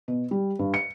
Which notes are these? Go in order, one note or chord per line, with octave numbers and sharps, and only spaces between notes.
B2
G3
G2
C#7